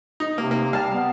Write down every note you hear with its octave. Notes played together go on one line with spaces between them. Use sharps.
D#4
C3 A#3
A#3
G3 F5 A5
B3